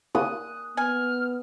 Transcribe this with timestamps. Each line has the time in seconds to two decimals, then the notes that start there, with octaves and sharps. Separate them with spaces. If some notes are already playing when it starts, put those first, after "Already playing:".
0.15 D#6 F#6
0.77 B3 G#5 F6